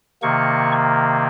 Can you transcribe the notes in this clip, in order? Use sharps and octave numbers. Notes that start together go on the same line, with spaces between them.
C3 D#3 A#3 C#6